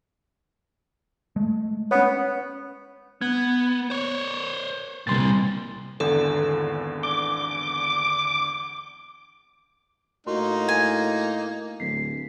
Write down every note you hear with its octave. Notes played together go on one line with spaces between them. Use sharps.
G#3 A3
B3 C#4 B4 C#5
B3 G#6
C5 C#5
C2 A#2 G3 C6 A6
G#1 E2 D3 A4
D6 G7
A2 A#3 D#4 F#4 A#4 C6
G#5
D1 B6 C7